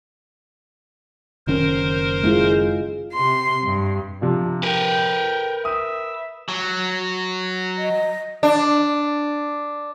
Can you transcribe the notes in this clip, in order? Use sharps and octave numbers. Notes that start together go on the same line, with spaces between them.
F#1 D#3 C#4 A#4 C5
G#3 E4 F4
C3 C6
G2
C3 F3 D4
A#4 B4 G5
E5 D#6
F#3
D#5
D4